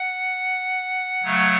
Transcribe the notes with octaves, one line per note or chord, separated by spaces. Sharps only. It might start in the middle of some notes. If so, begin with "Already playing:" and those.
Already playing: F#5
C#3 F#3 A3